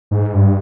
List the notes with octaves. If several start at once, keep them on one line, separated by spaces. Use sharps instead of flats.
G#2
G2